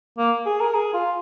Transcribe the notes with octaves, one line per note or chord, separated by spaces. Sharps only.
A#3
G#4
A#4
G#4
F4